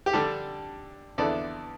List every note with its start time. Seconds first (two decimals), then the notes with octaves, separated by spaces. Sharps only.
0.06 G4
0.13 D3 G3 D4 A4
1.18 E2 D3 B3 E4 A4 D5